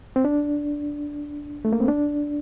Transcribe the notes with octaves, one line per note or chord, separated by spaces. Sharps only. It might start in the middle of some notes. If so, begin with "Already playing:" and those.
C4
D4
A3
A#3
C4
D4